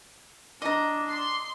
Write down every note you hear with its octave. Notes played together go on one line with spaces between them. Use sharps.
D4 D#5 A#5 D6
C6